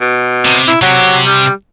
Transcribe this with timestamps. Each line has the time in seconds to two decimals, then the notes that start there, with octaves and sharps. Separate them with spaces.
0.01 B2
0.45 C3
0.68 E4
0.82 C3 F#3 G4
1.26 G3